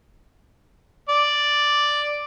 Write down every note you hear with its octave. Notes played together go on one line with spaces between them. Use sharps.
D5